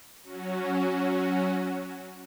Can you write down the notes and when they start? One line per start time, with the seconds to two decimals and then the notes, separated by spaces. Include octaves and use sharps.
0.23 F#3 C#4 F#4